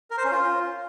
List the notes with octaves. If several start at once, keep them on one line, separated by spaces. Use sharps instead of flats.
A#4
C5
C#4
F4